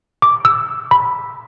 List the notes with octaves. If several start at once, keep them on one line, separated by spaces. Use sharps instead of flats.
D6
E6
B5